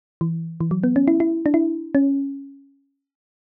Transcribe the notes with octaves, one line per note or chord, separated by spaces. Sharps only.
E3
E3
F#3
B3
C#4
E4
E4
D4
E4
C#4